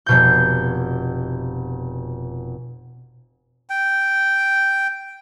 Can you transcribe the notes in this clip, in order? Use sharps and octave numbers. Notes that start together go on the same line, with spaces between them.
F1 B2 G6
G5